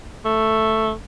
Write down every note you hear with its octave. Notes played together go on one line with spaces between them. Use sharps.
A3